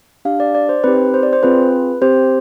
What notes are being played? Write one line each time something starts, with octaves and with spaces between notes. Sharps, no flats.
D4 G4 F5
D5
D5
C5
C4 D#4 G4 B4
C5
D5
C5
C4 F4 G#4 B4
C4 G4 C5